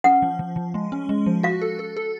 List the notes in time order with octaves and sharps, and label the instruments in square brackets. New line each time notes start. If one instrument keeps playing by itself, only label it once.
[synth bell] C#4 [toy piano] F#5
[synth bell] F3
F3
F3
G#3
C#4
G#3
F3
[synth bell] F#4 [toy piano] F5
[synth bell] A4
A4
A4